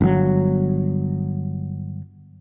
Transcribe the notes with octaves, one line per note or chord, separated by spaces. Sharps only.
G1 F#3